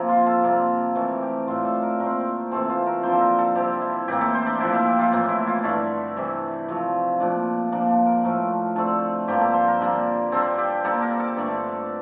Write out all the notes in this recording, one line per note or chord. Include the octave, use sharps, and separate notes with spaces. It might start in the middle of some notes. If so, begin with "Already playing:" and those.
Already playing: C3 F3 A#3
F4
A4
C3 G3 A#3
C3 E3 A3 A#4
G4
A2 G3 C4 F4
A4
A#4
A#2 A3 C4 A#4
C3 E3 A3 C4 A4
F4
A#4
D3 F3 A#3 C5
A4
A#4
A4
C3 G3 C4 G4
E4
A2 E3 A#3 G4
A4
C5
D4
A#2 F3 C4 E4
E4
G4
F4
A2 E3 A#3
E4
F4
G2 D3 A3 E4
C3 E3 G3
C3 F3 A3
A#2 F3 A3 D4
A#2 F3 A#3 D4
D4
A#4
A2 F3 A3 A#4
D3 A3 C4 A4
G2 D3 F3 A#3 G4
A4
C5
A#4
D3 G3 A#3
D3 G3 C4 A4
G4
D3 G3 A#3 A4
A#4
A4
G2 D3 A3